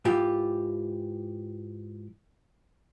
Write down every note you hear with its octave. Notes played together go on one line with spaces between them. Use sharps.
G#2 E3 F4 G4